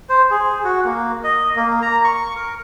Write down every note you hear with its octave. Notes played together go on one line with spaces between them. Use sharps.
C5
G#4
F#4
A#3
D#5
A#3
A#5
C#6
A#4